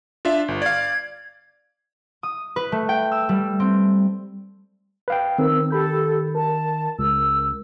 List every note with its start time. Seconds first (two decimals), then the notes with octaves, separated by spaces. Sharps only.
0.25 D4 F4 E5
0.48 G1
0.62 D5 F5 G#6
2.23 D#6
2.56 B4
2.72 A3
2.89 G5
3.12 E6
3.29 G3
3.60 C4
5.08 B4 F5 G5
5.38 D#3 C4 A#4 E6
5.70 G4 A4 B5 G6
6.35 A#4 A5
6.99 C#2 E6